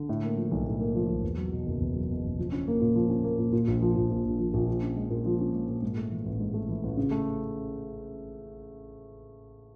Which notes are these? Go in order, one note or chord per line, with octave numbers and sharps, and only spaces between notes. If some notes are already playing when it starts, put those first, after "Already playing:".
Already playing: D3
A2
A#3
F3
B1
A2
A#3
F3
B1
E2
F#3
B2
F#1
E2
F#3
B2
F#1
F3
C#4
A#3
A#2
F3
C#4
A#3
A#2
A#2
A#1
F3
A#1
A#2
A#1
F3
A#1
F3
C#4
G#3
A#2
F3
C#4
G#3
A#2
G#2
A3
E3
A1
G#2
A3
E3
A1
C#3
A3